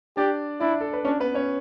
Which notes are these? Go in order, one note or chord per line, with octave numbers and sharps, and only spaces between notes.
D4 G4 D5
D4 E4 D5
A4
B4
C#4 D4 C#5
B3 B4
C#4 C#5